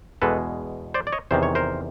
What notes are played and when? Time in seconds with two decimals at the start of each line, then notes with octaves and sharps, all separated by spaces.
0.22 E2 B2 G#3 A4 B4
0.94 C5 D5
1.07 D5
1.13 C#5 D#5
1.31 E2 C3 D#3 C5
1.43 C#5
1.55 A#4 C5